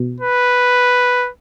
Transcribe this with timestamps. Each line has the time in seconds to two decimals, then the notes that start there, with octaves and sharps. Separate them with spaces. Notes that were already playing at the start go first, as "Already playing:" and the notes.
Already playing: B2
0.21 B4